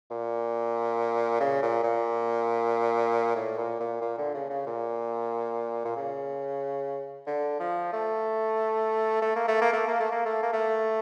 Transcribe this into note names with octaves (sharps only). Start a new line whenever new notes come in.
A#2
C#3
A#2
A#2
A2
A#2
A#2
A#2
D3
C#3
C#3
A#2
A#2
C#3
D3
F3
A3
A3
A#3
A3
A#3
A3
A#3
A3
A#3
A3
A#3
A3